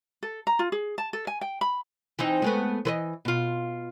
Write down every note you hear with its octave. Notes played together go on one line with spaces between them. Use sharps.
A4
A#5
F4
G#4
A5
A4
G#5
G5
B5
E3 C4 D#4
G#3 A3 B3
E3 B4 D#5
B2 F4